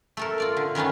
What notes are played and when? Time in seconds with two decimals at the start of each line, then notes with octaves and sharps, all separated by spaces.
0.17 A3 A4 A#4
0.38 F4 D5 F5
0.57 D3
0.75 D#3 B3 C#4 D#4 F4